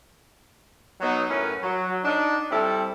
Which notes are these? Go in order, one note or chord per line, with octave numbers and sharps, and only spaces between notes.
F#3 B3 D#4
F#2 A2 C#4 E4 A#4 B4
F#3
D4 D#4
G3 C4 E4 A4